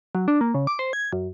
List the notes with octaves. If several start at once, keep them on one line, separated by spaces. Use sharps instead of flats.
F#3
D4
A#3
C#3
D6
C5
G#6
F#2